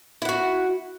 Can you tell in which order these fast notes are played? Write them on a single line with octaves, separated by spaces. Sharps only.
E4 F#5 F#4